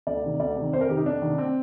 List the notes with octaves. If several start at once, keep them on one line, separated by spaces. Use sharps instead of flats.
D2 D5
C3 D#3
D2 D5
C3
D#3
F2 C5
A#4
C3 D#3 G4
D#4
F2 D4
C3 D#3
C4